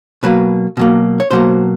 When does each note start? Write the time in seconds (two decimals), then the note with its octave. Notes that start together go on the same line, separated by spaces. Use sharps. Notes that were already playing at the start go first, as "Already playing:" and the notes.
0.23 B2 F#3 A#3 B4
0.77 B2 F#3 A#3
1.20 C#5
1.31 B2 F#3 A#3 C5